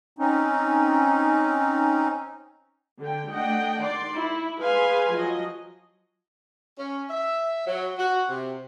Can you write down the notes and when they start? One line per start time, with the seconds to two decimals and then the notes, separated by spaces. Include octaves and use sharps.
0.19 C4 C#4 D#4
2.99 D3 G5
3.31 A3 D4 D#5 F#5 G5
3.81 D#3 D5 C6
4.14 E4
4.59 G#4 B4 F5 G#5 C6
5.12 F3 F#3 D#5
6.79 C#4
7.10 E5
7.66 F#3
7.98 F#4
8.30 C3